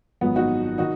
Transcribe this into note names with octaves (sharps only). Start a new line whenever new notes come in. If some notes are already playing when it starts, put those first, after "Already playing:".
G#1 F#2 F3 G#3 B3
D#4 F#4
D#3 D#4 F#4